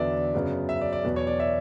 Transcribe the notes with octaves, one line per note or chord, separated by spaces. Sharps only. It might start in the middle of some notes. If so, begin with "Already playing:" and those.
Already playing: E2 D3 F#3 B3 D5 E5
F#2 C#3 F#3 B3
E5
D5
D5
E2 B2 F#3 B3
C#5
D5
E5